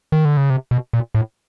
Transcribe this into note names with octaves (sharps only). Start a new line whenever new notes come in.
D#3
D3
C#3
C3
B2
A#2
A2